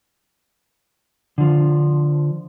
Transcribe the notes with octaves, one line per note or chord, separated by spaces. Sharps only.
D3 F3